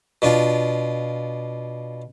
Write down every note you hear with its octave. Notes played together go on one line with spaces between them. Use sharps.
B2 D4 F4